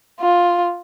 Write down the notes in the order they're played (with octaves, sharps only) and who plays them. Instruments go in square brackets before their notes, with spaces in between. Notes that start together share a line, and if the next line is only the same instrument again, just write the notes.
[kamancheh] F4